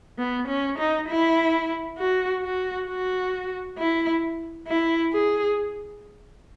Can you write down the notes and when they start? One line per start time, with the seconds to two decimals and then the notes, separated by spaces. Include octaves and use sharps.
0.18 B3
0.48 C#4
0.78 D#4
1.08 E4
1.98 F#4
2.43 F#4
2.88 F#4
3.77 E4
4.67 E4
5.13 G#4